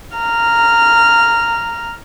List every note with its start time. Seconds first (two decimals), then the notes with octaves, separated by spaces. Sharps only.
0.18 A#5 F6